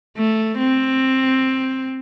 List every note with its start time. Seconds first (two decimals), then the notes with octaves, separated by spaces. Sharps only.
0.17 A3
0.59 C4